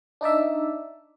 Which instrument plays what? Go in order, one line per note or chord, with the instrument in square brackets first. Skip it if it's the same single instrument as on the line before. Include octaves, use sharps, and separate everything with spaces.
[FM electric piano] D4 D#4 D5 E5